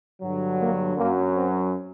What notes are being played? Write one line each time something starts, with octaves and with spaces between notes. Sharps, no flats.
G2 D3 F#3
A#3
F#2 F#3 A#3
C4